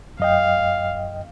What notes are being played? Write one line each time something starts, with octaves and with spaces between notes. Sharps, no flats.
F#2 D#5 F5 G5